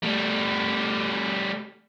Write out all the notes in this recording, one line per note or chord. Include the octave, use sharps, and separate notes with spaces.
G3 A3